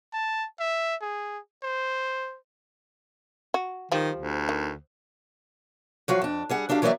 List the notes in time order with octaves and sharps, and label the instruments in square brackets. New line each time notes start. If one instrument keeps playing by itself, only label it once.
[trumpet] A5
E5
G#4
C5
[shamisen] F#4
[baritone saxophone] D#3 [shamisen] F3 G3
[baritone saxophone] D2
[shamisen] D#3
[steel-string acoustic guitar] F3 F#3 F#4 F5
F2 D4
G3 G#4 F#5
F#3 D4 G4 A4 F5
E3 F#3 A#3 C#5 D5 E5